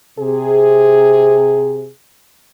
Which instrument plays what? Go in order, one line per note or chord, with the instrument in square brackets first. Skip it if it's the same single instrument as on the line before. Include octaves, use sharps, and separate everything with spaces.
[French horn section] C3 G#4